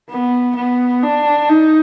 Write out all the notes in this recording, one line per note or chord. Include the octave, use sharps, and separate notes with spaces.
B3
B3
D4
D#4